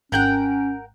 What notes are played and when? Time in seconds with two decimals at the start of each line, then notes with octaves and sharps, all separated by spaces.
0.12 G#1 C#4 A#4 F#5 G5 F#6 G6